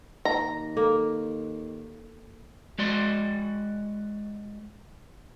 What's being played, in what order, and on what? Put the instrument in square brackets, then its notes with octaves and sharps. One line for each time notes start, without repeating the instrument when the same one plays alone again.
[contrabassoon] D#2 [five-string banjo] A#5
[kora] A#3 [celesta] A4
[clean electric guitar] G#3 F#4 D5 C6